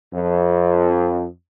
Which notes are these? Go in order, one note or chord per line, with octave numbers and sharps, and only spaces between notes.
F2